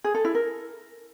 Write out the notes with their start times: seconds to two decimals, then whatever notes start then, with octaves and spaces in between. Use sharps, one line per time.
0.04 G#4
0.15 A4
0.25 E4
0.35 A#4